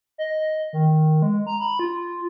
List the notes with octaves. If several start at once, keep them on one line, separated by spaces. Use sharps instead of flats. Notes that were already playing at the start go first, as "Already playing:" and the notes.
D#5
D#3
G#3
A#5
B5
F4